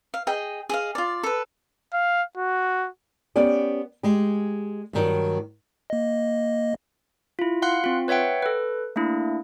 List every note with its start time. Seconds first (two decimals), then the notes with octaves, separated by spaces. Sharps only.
0.14 F5
0.27 G#4 D#5 G5
0.69 G#4 D#5 F5
0.95 F4 D5
1.23 A4 B4
1.94 F5
2.37 F#4
3.36 B3 C#4 G4 D5
4.03 G#3 G4
4.93 G2 D#3 F#3
5.90 A#3 D#5
7.39 E4 F4
7.62 F5 F#5 C6 F#6
7.84 C4 F4
8.08 B4 C#5 E5 F#5 G5
8.42 A4 B4
8.96 A3 A#3 D4 E4